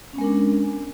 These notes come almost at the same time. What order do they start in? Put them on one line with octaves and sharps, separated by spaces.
C#4 B3 G#3 A#4 D4